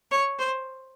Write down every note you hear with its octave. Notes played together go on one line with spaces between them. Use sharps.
C#5
C5